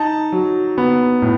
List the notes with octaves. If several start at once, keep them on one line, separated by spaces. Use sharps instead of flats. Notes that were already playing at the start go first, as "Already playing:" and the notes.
Already playing: D#4 A5
F#3
B3
A2